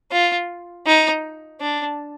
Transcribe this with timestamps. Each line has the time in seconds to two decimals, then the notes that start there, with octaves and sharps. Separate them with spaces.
0.12 F4
0.86 D#4
1.61 D4